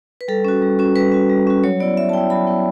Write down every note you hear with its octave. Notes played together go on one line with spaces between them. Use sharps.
B4
G3 A4
C#4 F#4
G3
C#4 F#4
G3 B4
C#4 F#4
G3
C#4 F#4
F#3 C#5
B3 E4 D5
F#3 E5
A5
B3 E4 G5
F#3 B5
B3 E4